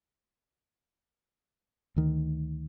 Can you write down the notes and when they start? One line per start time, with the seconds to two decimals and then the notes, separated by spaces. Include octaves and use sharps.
1.96 D2 D#3